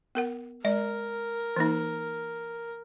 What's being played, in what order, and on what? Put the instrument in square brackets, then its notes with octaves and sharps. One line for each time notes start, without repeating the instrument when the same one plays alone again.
[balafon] B3 A#4 F#5
[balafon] G#3 D5 [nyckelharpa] A#4
[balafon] E3 A#3 D#4